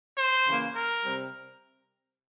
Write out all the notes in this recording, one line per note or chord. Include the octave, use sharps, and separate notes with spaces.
C5
C#3 E3 A#3
A#4
C3 G3 C4